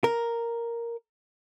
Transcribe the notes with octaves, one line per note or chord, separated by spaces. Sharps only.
A#4